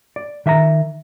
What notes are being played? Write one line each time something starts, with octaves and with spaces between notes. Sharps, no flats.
D5
D#3 E5 G5 A#5